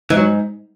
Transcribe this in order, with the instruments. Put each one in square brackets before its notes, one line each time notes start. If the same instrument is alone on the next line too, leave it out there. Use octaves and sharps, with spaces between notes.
[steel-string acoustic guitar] G#2 [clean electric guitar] E3
[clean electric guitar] F#3